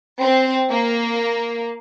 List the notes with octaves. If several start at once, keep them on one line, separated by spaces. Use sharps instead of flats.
C4
A#3